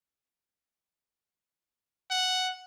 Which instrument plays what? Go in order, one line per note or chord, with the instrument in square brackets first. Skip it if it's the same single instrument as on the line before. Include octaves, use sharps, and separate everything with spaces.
[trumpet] F#5